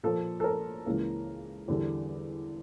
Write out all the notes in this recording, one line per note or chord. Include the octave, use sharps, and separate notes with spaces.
A#2 F3 A#3 A4
A4
A#4
C#2 C#3 E3 A#3
E2 D3 G3